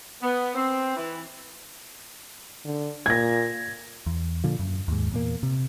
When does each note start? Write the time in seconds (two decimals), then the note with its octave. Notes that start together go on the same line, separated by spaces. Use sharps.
0.22 B3
0.55 C4
0.96 E3
2.65 D3
3.06 A#2 G#6 A#6
4.06 E2
4.44 A#2 D3 F3
4.59 F#2
4.88 D#2 G#2
5.12 E2 A#2 A#3
5.43 C3